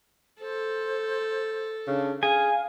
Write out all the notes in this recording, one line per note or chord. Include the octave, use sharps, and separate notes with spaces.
A4 C5
C#3 D4
G#4 F5 G#5